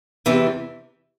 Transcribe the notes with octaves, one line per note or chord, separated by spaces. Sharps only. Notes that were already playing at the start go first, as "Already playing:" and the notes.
E2 C3 E3